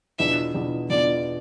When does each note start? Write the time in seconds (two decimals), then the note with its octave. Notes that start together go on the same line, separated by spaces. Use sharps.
0.19 E2 B2 B3 D4 F4 E5
0.54 E2 B2 B3 D4 F4
0.90 E2 B2 B3 D4 F4 D5